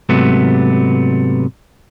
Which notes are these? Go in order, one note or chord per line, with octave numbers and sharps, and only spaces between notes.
G#2 C3 F#3 A3 B3